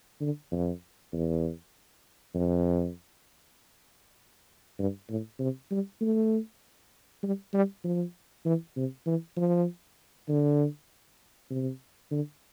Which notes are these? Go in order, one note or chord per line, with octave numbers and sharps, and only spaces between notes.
D3
F2
E2
F2
G2
A2
C3
G3
A3
G3
G3
F3
E3
C3
E3
F3
D3
C3
D3